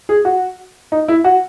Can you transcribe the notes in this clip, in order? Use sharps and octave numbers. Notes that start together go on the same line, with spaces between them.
G#4
F#4
D#4
E4
F#4